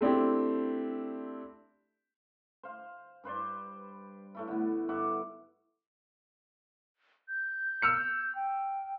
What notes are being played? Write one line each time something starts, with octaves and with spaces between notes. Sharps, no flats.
A3 C4 D4 E4 G4
C5 F5
G2 B4 C5 D5
A2 A3 E4
D3 B3
G2 E5 F#5 D6
G6
E6 F6 C#7
G5